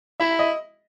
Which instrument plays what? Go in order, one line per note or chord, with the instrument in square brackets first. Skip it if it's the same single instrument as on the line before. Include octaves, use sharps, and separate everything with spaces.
[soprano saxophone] E4 [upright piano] E5
[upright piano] D#5